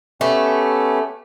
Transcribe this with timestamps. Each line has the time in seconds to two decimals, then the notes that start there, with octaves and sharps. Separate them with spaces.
0.21 A3 B3 C#4 G4